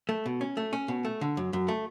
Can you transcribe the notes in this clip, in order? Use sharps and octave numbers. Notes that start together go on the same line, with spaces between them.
A3
B2
C#4
A3
C#4
B2
A3
D3
F#2
F#2
A3